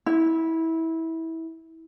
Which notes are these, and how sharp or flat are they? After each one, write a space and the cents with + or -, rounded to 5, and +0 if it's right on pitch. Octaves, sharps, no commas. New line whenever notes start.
E4 -20